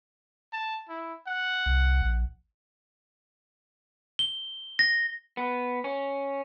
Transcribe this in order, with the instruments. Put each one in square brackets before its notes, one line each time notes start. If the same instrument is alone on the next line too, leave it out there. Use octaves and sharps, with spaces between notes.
[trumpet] A5
E4
F#5
[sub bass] C2
A#1
[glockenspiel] G7
A#6
[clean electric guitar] B3
C#4